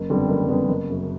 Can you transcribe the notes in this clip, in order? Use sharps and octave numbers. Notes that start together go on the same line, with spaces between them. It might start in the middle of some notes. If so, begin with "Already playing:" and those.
Already playing: F#1
F2 D3 G3 B3
F#1
F2 D3 G3 B3
F#1
F#2 C#3